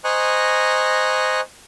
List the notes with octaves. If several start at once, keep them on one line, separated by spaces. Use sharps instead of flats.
C5 D#5 G#5 A#5 C#6 F#6